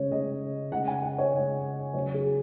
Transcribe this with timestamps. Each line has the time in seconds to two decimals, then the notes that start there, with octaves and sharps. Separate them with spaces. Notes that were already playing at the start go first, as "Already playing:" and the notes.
Already playing: C#3 G#3 C#5
0.12 C#3 G#3 D#5
0.72 C#3 G#3 F#5
0.88 G#5
1.02 F#5
1.18 C#5
1.33 C#3 G#3 D#5
1.94 C#3 F#3 C#5
2.14 G#4